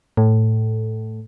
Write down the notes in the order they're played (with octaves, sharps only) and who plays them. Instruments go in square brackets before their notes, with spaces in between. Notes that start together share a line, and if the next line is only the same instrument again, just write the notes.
[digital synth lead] A2